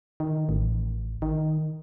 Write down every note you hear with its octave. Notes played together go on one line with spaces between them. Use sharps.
D#3
A1
D#3